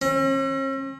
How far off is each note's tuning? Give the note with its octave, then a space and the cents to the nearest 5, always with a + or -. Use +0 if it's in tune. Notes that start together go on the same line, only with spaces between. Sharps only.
C#4 -45